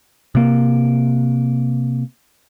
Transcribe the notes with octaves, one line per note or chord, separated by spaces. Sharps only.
C3 A#3